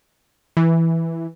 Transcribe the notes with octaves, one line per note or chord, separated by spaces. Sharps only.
E3